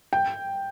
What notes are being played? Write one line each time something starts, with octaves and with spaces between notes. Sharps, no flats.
G5